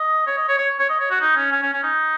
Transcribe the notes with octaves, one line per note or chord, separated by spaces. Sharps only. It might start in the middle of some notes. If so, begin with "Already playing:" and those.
Already playing: D#5
C#5
D#5
C#5
C#5
C#5
D#5
C#5
F#4
D#4
C#4
C#4
C#4
C#4
D#4